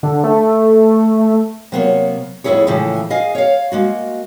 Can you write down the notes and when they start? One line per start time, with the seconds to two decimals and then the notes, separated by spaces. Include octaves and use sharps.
0.03 D3
0.24 A3
1.72 C3 F#3 A#3 B3 C5 C#5
2.44 F2 A2 C3 E4 G#4 C#5
2.67 A2 C#3 E3 F3 G#3 A3
3.10 G#4 D#5 F5 G#5
3.35 C#5 F5
3.72 G#3 A#3 F#4